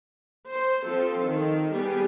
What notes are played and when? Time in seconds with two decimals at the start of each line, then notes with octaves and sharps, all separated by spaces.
0.47 C5
0.84 F3 C4 F4 A4
1.23 D#3
1.73 G3 B3 G4 G#4